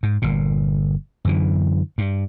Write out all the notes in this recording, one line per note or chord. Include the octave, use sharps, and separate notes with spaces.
G#2
G1 A#2
F#2 D3 E3
G2